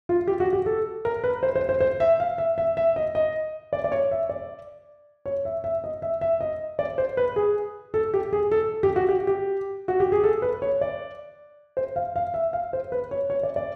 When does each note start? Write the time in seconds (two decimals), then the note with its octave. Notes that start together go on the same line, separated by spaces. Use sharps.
0.09 F4
0.27 G4
0.40 F#4
0.53 G4
0.66 A4
1.05 A#4
1.24 B4
1.43 C5
1.55 C5
1.69 C5
1.80 C5
2.00 E5
2.20 F5
2.38 E5
2.58 E5
2.77 E5
2.96 D#5
3.15 D#5
3.73 D5
3.84 D5
3.92 C#5
4.11 E5
4.29 D5
5.26 C#5
5.45 E5
5.64 E5
5.84 D#5
6.02 E5
6.21 E5
6.41 D#5
6.79 D5
6.98 C5
7.17 B4
7.36 G#4
7.94 A4
8.14 G4
8.33 G#4
8.51 A4
8.83 G4
8.96 F#4
9.09 G4
9.27 G4
9.88 F#4
10.00 G4
10.12 G#4
10.24 A4
10.42 B4
10.62 C#5
10.81 D5
11.77 C5
11.96 F5
12.16 F5
12.34 E5
12.53 F5
12.73 C5
12.92 B4
13.11 C#5
13.30 C#5
13.43 D5
13.56 D5